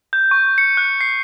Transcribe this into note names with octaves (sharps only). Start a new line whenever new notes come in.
G6
C#6
C#7
F#6
C7